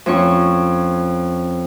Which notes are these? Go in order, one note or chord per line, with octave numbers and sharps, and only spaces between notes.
F2 C#4 C#6